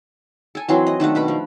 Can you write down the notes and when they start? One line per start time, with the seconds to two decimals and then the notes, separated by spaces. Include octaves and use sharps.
0.55 A4 G#5
0.69 E3 F#3 C4 C6
0.87 D#5
1.00 D#3 A3 D4 F#5
1.15 B2 B4 B5
1.28 F3